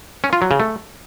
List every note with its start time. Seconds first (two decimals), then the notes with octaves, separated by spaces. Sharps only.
0.24 C#4
0.33 F4
0.42 F#3
0.51 C#3
0.60 A3